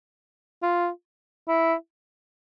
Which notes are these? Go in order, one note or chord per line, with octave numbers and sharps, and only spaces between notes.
F4
E4